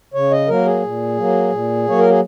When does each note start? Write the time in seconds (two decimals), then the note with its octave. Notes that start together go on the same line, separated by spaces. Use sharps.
0.14 C#3 C#5
0.31 D#5
0.48 F#3 A#3 A#4
0.66 G#4
0.83 A#2
1.17 F#3 A#3
1.51 A#2
1.86 F#3 A#3 C#5
1.99 A#4
2.10 G#4